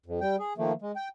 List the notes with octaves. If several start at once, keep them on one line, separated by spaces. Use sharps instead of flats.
F2
G3 G5
G#4
D#3 F3 A3 A#3
G#3
G5